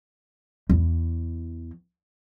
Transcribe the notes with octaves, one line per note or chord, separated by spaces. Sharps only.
E2 E3